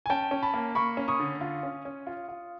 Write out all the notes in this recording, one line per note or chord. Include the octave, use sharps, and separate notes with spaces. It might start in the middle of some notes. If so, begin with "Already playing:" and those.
G#5
C#4 G5 A5
C#4
A5 B5
A#3
A#3 B5 C#6
C#4
C#6 D#6
D3
F4
C#4
C#4
F4
F4